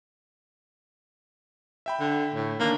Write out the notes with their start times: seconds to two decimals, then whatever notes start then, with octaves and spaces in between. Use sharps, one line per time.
1.86 E5 G5 B5
2.00 D3
2.35 A2
2.60 D3 D#3 A#3 D4